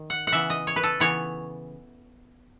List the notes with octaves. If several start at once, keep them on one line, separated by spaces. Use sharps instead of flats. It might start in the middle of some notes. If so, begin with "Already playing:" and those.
Already playing: D#3
F#5
F#5
C#3 E3 B3 E5
D#5
C#5
B4
A4
C#3 E3 B3 C#5